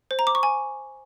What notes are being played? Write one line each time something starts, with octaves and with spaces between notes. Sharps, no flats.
C5
A#5
D6
C#6
G#5